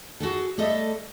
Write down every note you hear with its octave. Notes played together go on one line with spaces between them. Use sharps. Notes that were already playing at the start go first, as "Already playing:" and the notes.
F#4 G#4 A4
G3 A3 A4 D#5 E5